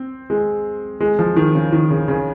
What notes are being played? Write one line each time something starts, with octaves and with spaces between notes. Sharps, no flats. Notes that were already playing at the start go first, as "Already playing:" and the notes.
Already playing: C4
G#3
G#3
F3
D#3
C#3
D#3
C#3
C#3